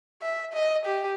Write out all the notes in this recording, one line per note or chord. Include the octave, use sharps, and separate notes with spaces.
E5
D#5
G4